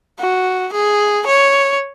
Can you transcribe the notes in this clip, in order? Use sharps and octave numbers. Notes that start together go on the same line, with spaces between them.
F#4
G#4
C#5